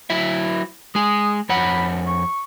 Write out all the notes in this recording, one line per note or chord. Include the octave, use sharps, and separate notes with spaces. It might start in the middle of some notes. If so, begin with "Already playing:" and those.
F#3 E4 E5
G#3 G#4 D#6
F2 C#5 F#5 B5
C#6